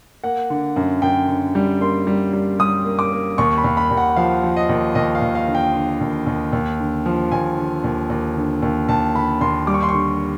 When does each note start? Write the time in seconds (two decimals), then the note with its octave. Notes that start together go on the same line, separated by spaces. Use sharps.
0.24 A#3 F#5
0.50 D3
0.76 F#2
1.02 F#2 G5
1.28 D3
1.55 G3
1.81 A#3 C6
2.07 G3
2.33 G3
2.59 G3 D#6
2.85 A#3
2.99 D6
3.12 A#3
3.38 D#2 C#6
3.58 B5
3.64 D#2
3.77 B5
3.91 D#2
3.97 F#5
4.16 F3 F5
4.43 F3
4.56 D#5
4.69 D#2
4.95 D#2 D#5
5.15 F5
5.22 D#2
5.35 F5
5.48 D3
5.55 G5
5.74 D3
6.01 D#2
6.26 D#2
6.53 D#2
6.79 D3
7.06 F3
7.32 D#2 G#5
7.58 D3
7.84 D#2
8.10 D#2
8.36 D3
8.62 D#2
8.88 D#2 A5
9.15 D3 B5
9.41 D#2 C6
9.67 G3 D6
9.74 C#6
9.82 C6
9.89 D3 C#6